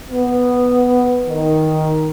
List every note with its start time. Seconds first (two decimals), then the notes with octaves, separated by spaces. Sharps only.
0.10 B3
1.28 D#3